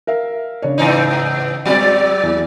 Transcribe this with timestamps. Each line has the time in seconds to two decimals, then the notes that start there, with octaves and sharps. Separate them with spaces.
0.07 A#4 E5 F5
0.62 C#3 D4 C#5
0.78 G#2 E3 D#4
1.65 G#1 F#3 C4 F#4 D5
2.23 E2 E3